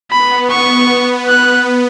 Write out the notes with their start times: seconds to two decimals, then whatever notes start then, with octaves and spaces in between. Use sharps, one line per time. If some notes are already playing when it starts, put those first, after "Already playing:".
0.11 B3 B5
0.50 C#6
0.90 B3
1.29 F#6